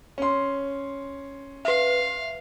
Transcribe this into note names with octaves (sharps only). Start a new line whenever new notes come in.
C#4 C6
B4 E5 F5